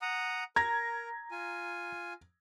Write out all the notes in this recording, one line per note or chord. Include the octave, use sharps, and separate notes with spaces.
F#5 A#5 D#6
A#4 A#5 G#6 A#6
F4 G#5